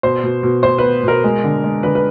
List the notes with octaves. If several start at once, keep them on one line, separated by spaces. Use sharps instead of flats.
B2 C5
B2
B2
B2 C5
B3 B4
B2 A#4
G#3
D3
G#3
D3 B4
B4